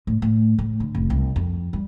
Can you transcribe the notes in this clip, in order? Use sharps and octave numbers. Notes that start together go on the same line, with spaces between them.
A2
A2
A2
D3
F1
C2
F2
G3